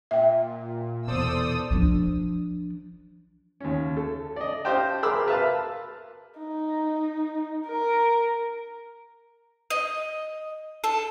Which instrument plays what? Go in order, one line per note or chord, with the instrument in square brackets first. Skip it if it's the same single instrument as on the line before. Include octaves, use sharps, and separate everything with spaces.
[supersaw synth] A#2 [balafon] E5 G5
[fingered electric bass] E2 B2 [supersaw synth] A4 C5 D5 [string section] D#6 E6
[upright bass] F3 D4
[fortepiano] D#2 C#4
A4
D5 D#5
G4 C5 D#5 F5 G5 A5
G#4 A#4 B5 C6 D6 E6
A#4 B4 E5 F5 A5
[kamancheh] D#4
A#4
[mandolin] D#5
A4